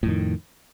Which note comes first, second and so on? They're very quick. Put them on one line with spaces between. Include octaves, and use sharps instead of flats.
A2 F2 D#3